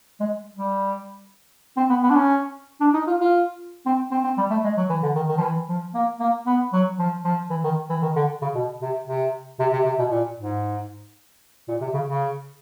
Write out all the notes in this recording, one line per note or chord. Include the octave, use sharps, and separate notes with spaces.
G#3
G3
C4
B3
B3
D4
C#4
D4
D#4
F4
F4
C4
C4
C4
G3
A3
G#3
F#3
E3
D3
D#3
D#3
F3
E3
F3
A#3
A#3
B3
F#3
F3
F3
E3
D#3
E3
D#3
D3
C#3
B2
C3
C3
C3
C3
C3
B2
A#2
G#2
A#2
C3
C#3
C#3